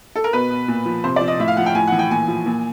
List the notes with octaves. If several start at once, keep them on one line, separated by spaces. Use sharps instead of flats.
A4
A#4
B2 B4
B2
A#2
F3
C3 C5
F3 D5
D#5
A2 E5
F5
F3 F#5
G5
A2 G#5
E3 F#5
G5
A#2 G#5
F3
A#2